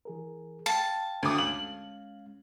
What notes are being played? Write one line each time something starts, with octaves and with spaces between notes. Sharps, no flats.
E3 G#4 A#4
F5 G5 A5
D2 D6
G#3 C#4 F5 F#7